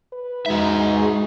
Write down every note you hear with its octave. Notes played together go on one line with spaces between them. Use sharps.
B4
G#2 G#3 D#4 F#4 E5